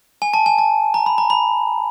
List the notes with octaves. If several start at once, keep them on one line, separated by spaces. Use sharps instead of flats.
G#5
A5
G#5
A5
A#5
B5
A#5
B5